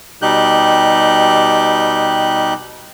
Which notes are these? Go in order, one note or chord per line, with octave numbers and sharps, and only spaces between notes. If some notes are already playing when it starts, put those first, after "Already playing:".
B2 G3 D#4 G4 F#6 G6